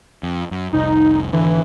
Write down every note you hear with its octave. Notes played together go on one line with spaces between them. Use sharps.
F2
F#2
F1 C2 D#4
G#1 D3 E3